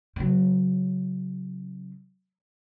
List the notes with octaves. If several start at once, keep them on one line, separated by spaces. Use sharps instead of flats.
C#3 F#3